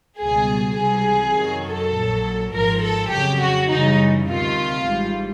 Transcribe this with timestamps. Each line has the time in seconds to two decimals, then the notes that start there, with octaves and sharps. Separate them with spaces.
0.19 C#2 B2 G3 G#4
0.77 C#2 C3 E3 G3 G#4
1.36 F#2 D#3 F#3
1.65 A4
1.95 A#1 A#2 F#3
2.53 G#1 G#2 F3 A#4
2.82 A4
3.11 F2 C#3 F#3 G4
3.40 F#4
3.70 F#2 C#3 E3 G3 D#4
4.28 D2 C3 D#3 F4
4.86 G#1 G#2 E3 G3